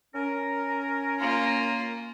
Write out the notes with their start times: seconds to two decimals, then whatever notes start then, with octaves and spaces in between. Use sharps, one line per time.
0.14 C#4 A#4
1.19 A#3 F4